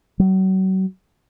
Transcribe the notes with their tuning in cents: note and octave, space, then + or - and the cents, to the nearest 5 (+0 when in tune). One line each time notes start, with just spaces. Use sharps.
F#3 +35